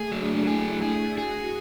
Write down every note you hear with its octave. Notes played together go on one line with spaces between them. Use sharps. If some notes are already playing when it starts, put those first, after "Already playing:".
Already playing: A3 G#4
F#3 D4
E4 G#4
G#4
F#4 G#4